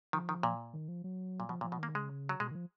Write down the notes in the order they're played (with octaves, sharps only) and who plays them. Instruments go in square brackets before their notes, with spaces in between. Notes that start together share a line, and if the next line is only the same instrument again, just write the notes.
[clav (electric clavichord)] D#3 [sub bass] F3
[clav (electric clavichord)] D#3
A#2
[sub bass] D#3
F3
F#3
[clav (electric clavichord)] A#2
[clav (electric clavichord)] B2 [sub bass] F3
[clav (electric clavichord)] A#2
[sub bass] F3
[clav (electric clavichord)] B2
[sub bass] D#3 [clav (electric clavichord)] A#3
[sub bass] C#3 [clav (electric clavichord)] G#3
[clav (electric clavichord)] F#3
[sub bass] B2 [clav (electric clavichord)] G#3
[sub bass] D#3
F3